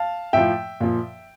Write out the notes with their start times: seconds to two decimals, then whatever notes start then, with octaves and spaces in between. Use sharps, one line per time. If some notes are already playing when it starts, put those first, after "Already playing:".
Already playing: F5 A5
0.33 A2 F3 E5 G5
0.80 A#2 F3